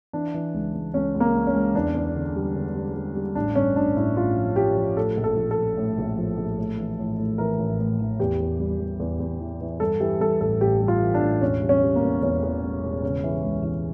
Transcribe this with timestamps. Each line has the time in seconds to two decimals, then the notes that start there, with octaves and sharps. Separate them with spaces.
0.13 E3 D4
0.34 E3
0.54 C#2
0.74 C#2
0.94 C#2 C#4
1.14 C#2
1.20 A#3
1.34 C#2
1.47 C#4
1.54 C#2
1.74 E2 D4
1.94 E2
2.15 D3
2.36 G3
2.55 D3
2.75 G3
2.95 G3
3.15 G3
3.35 A1 D4
3.55 G2 C#4
3.76 A1 D4
3.96 A1 E4
4.16 A1 F4
4.37 F3
4.56 F3 G4
4.77 F3
4.96 A2 A4
5.17 A#1
5.24 A4
5.37 A#1
5.51 A4
5.57 F3
5.77 A2
5.98 A#1
6.18 F3
6.37 A#1
6.58 A2
6.78 E3
6.99 A2
7.18 A2
7.38 E3 A#4
7.58 A1
7.79 A2
8.00 E3
8.19 E2 G4
8.40 E2
8.59 G3
8.80 E2
9.00 E2
9.20 E2
9.40 E3
9.61 E3
9.80 G2 A4
10.00 E3 G4
10.20 G2 A4
10.41 A1 A4
10.61 A1 G4
10.81 G3
10.88 F4
11.02 E3
11.14 D4
11.22 A1
11.41 E1 C#4
11.62 G3
11.69 C#4
11.82 G3
11.96 A#3
12.03 E2
12.22 E2 C#4
12.43 E2
12.62 G3
12.83 E1
13.04 C#3
13.24 E3
13.44 C#2
13.63 E3